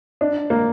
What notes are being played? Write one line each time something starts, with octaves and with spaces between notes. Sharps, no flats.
D4
A#3